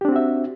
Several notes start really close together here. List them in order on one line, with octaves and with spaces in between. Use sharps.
G4 D4 C4 F#4 E5